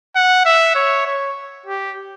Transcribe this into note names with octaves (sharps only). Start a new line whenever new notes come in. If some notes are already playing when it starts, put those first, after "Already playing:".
F#5
E5
C#5
C#5
G4